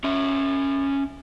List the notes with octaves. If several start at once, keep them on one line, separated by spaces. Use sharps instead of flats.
C#4 E5